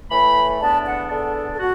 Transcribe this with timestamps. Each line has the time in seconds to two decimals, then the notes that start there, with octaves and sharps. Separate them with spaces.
0.10 A2 E3 A3 B5
0.60 E2 D3 B3 D4 A5
0.85 F#5
1.10 E2 D3 B3 D4 A4
1.53 A4
1.59 F#4